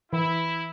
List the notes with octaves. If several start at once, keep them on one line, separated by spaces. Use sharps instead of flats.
E3 E4